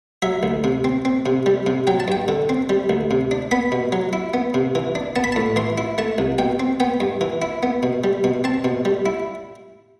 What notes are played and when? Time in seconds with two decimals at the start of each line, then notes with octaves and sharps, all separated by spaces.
0.22 F#3 E5
0.43 D2
0.64 C3
0.84 C4
1.05 C4
1.26 C3
1.46 G3
1.66 C3
1.87 F#3 G5
2.00 A5
2.08 G2 G5
2.28 D3
2.49 C4
2.69 G3
2.90 D2
3.11 C3
3.31 D4
3.51 B3 B5
3.72 B2
3.92 F#3
4.13 E4
4.34 B3
4.54 C3
4.75 E3
4.95 D4
5.16 B3 A5
5.24 B5
5.32 A5
5.36 A2
5.56 E3 C6
5.78 E4
5.98 A3 A5
6.18 C2
6.38 B2 G5
6.60 C4
6.80 B3 G5
7.00 G2
7.21 E3
7.42 E4
7.63 B3
7.83 B2
8.04 G3
8.24 B2
8.44 C4 A5
8.64 B2
8.85 G3
9.06 E4